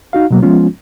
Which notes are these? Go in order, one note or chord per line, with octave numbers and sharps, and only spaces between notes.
D#4 F#4 F5
B2 F#3 A#3
F3 G#3 B3 C#4 F4